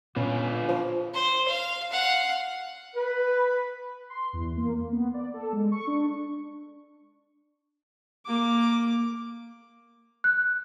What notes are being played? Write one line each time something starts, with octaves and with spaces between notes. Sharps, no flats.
A#2 B3 C#4 D4 F4 B4
F3
C5
F5
F5 F#5
B4
C6
E2
A#3
A#3
B3
D5
A4
G#3
C#6
D4
A#3 D6
F#6